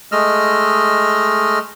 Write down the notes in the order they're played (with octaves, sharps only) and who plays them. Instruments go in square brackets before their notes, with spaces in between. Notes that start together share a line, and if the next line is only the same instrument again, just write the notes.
[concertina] G#3 A3 D#5 E6 F6